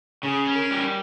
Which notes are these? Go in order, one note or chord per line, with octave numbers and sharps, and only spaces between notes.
C#3 G#4
C#4
A#4
G3